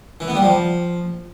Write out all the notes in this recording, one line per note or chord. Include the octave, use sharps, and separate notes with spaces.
E3
B3
G3
F3